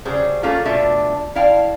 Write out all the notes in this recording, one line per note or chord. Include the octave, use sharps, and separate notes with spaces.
C#3 F#3 G3 G#4 C5
A3 A#3 C#4 F4 G#4 A4
B2 A3 D4 F4 E5
E4 D5 F5 G5 A5